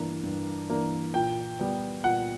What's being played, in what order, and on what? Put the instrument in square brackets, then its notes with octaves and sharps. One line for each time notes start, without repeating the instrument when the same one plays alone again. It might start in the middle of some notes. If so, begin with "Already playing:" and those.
Already playing: [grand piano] G2 E3 A#3 D4
G2
E3 A#3 D4
A#2 G5
G3 B3
A#2 F#5